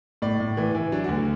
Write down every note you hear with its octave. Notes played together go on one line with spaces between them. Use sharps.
A2 D5
A2
E3
E3
F#3 D4
D2 F#4